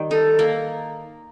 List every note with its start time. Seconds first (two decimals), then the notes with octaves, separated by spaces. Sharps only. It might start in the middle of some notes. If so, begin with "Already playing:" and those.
Already playing: D#3 G3
0.10 D#4 A4
0.39 A#3